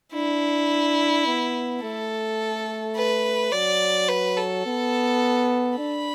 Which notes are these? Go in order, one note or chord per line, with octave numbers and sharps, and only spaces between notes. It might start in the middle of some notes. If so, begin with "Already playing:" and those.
D4 E4
B3
A3 A4
B4
F#3 D5
B4
A4
B3
D4 B5